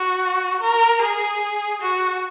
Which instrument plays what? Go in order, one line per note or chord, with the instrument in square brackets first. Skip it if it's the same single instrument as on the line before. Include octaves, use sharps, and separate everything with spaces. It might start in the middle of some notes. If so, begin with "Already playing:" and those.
Already playing: [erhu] F#4
A#4
G#4
F#4